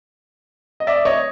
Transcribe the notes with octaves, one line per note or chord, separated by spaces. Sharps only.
D#5
D5 E5
C#5 D#5